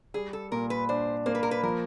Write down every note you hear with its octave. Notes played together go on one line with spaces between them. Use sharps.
G3 G#4
A4
A#2 A#4
B4
D4 C5
A#3 C5
B4
A#4
B4
F3 A#4